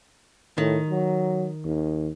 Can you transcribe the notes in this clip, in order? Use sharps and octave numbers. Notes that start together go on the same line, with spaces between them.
A2 D#3
F#3
D#2